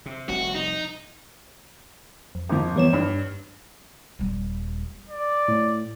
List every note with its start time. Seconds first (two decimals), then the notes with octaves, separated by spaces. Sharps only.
0.06 C3
0.29 F1 C2 F#4
0.55 D#4
2.35 F2
2.49 G#1 F3
2.76 E3 G3 B3 C#5 E7
2.93 G2 D4
4.19 D#1 G3
5.09 D5
5.48 A2